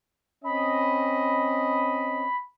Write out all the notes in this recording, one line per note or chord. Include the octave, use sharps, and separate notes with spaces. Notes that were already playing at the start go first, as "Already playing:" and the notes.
C4 C#4 D#5 B5